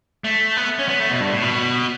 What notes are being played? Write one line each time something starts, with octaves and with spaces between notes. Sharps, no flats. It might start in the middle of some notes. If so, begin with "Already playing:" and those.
A3
B3
C#4
B3
A3
B2
G2
A2
B2